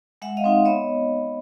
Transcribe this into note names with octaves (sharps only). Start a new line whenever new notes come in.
G#3 E5 F#5
D#5 F5
C4 D#4
B3 C#5 D#5